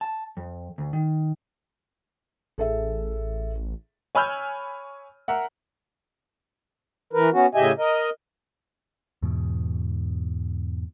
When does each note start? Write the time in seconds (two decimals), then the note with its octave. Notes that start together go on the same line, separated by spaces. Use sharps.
0.01 A5
0.37 F2
0.78 D2
0.93 D#3
2.58 A1 G#4 A4 E5
4.15 C#5 G#5 B5 E6 F6 G6
5.28 A#4 E5 F#5
7.13 E3 A#4 B4
7.33 B3 C#4 F#4
7.55 A2 C#3 G4 D#5 E5 G#5
7.78 A#4 D#5
9.22 E2 G#2 B2